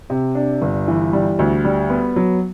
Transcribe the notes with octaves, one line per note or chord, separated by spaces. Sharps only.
C3
D4
G1
E3
G3
D2
G3
B3
F#3